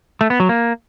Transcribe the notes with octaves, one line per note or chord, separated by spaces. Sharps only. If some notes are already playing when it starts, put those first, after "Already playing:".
A3
B3
F#3
A#3